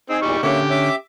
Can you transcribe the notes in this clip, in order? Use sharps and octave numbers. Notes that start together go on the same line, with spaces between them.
C4 D#4 G#4
E2 A#2 G3 C#6
D3 A#3 C#4 G4 C#5 E5
C#4 E5 D6